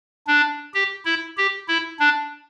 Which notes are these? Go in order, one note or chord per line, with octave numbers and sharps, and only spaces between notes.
D4
G4
E4
G4
E4
D4